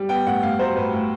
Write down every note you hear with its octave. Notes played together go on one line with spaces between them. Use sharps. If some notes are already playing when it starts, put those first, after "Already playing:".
Already playing: G3
B3 G5
A2 F#5
A2 F5
F#3 C5
A2 B4
A2